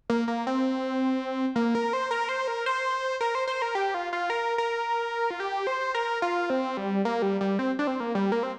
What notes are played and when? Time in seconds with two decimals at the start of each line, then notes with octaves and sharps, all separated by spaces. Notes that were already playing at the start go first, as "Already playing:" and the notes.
0.10 A#3
0.28 A#3
0.47 C4
1.56 A#3
1.75 A#4
1.93 C5
2.11 A#4
2.29 C5
2.48 A#4
2.66 C5
3.21 A#4
3.35 C5
3.47 C5
3.62 A#4
3.75 G4
3.94 F4
4.13 F4
4.30 A#4
4.58 A#4
5.30 F4
5.40 G4
5.67 C5
5.95 A#4
6.22 F4
6.50 C4
6.77 G3
7.05 A#3
7.22 G3
7.41 G3
7.59 C4
7.79 D4
7.87 C4
8.00 A#3
8.15 G3
8.32 A#3
8.43 C4